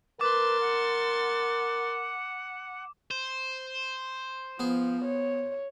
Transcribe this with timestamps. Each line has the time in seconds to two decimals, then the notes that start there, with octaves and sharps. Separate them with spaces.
0.21 A#4 B4 C6 D6 A6
0.61 F#5
3.11 C5
4.59 F3 B3 G#4
5.05 C#5